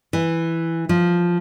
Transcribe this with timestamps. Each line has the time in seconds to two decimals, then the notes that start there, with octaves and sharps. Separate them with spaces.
0.13 E3
0.89 F3